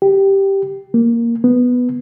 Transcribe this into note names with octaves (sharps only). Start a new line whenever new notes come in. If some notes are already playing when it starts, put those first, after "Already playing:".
G4
A#3
B3